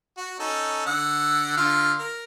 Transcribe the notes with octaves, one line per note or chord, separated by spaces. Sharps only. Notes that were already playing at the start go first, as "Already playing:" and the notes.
F#4
C#4 D#4 A4
D3 F#5 E6
D3 F4 F6
A#4